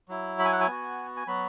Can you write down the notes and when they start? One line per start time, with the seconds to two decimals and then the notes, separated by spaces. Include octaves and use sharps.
0.08 F#3 E4
0.39 B5
0.45 G#5
0.52 F#5
0.60 G#5
0.67 B3 F#4
1.17 G#5
1.27 F#3 B3 F#4 B5